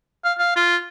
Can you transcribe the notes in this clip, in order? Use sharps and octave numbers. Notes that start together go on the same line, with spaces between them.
F5
F5
F4